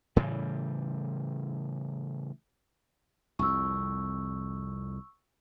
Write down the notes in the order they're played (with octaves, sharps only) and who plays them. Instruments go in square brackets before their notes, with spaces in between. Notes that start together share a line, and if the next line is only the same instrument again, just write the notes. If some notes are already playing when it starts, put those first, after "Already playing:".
[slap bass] A2 C#3 E3 G3
[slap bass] C2 F2 [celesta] C#6 E6